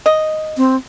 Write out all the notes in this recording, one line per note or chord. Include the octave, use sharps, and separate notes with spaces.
D#5
C4